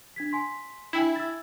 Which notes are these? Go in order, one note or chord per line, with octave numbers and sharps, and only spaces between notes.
D4 G#6 B6
G#5 C6 B6
D4 E4 G5 G#5
E6 G#6 A6